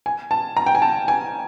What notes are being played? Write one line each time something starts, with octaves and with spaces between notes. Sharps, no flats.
G#5
A5
A#5
G5
G#5
A5
G#5